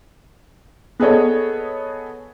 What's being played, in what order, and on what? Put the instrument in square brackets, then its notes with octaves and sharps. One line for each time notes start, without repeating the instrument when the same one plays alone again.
[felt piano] B3 G#4 A4 C#5 D#5